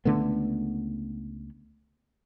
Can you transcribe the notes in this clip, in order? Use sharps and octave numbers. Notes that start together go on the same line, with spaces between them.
C#2 D3 A3 B3